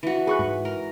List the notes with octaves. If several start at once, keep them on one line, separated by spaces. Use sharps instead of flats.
E3 F#4
G#4 B4 C#6 F#6
G#2
A#4